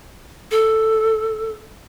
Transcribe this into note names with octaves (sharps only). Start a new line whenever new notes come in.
A4